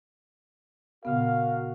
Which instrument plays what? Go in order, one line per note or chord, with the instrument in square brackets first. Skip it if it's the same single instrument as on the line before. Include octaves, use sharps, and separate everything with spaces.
[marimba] A#2 C#3 B3 [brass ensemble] F#4 A#4 [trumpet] F5